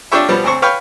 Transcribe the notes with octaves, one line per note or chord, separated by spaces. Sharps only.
D4 F4 G4 C#5 E5
B2 F3 G3 B3
D2 C4 C5 C#6
B4 C#5 F5 G5